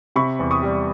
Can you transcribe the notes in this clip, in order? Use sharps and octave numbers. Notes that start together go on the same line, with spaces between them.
C3 B5 C#6
E2
C#6 D#6
G3